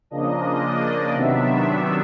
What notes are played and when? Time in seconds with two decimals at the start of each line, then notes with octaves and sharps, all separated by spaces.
0.10 C#3 F3 A#3 D4 D#5
0.62 D5
1.14 C3 D#3 F#3 B3 D4 E5
1.66 E5